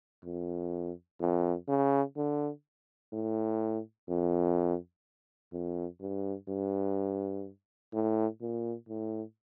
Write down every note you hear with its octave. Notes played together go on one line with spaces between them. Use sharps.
F2
F2
C#3
D3
A2
F2
F2
G2
G2
A2
A#2
A2